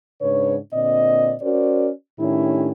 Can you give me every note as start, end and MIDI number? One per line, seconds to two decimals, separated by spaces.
0.21 0.57 44
0.21 0.57 49
0.21 0.57 62
0.21 0.57 71
0.21 0.57 73
0.73 1.35 46
0.73 1.35 50
0.73 1.35 60
0.73 1.35 74
0.73 1.35 75
1.42 1.89 61
1.42 1.89 66
1.42 1.89 70
1.42 1.89 72
1.42 1.89 74
2.20 2.71 45
2.20 2.71 51
2.20 2.71 61
2.20 2.71 62
2.20 2.71 64
2.20 2.71 67